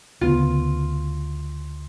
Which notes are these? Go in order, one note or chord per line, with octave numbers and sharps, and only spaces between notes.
D2 C#3 B3 F4